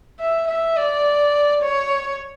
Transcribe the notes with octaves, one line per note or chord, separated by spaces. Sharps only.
E5
E5
D5
C#5